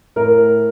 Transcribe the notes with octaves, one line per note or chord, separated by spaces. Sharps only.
A2 A#4